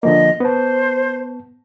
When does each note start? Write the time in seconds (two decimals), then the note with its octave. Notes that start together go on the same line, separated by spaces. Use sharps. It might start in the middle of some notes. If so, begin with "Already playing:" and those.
0.03 D3 F3 A#3 D#5
0.40 B3 C5 A5